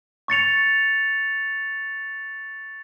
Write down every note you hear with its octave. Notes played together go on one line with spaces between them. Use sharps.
C#6 A6 C#7 F7